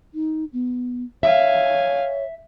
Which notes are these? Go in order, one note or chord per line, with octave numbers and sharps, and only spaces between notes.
D#4
B3
C#5 E5 F5 G#5